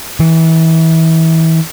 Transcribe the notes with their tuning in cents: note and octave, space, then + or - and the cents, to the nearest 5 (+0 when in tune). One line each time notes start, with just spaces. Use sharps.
E3 -30